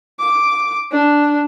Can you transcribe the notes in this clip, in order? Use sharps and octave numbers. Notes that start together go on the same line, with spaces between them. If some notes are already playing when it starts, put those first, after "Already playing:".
D6
D4